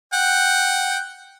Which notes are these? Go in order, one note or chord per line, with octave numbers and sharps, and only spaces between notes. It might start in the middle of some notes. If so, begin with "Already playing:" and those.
F#5 G5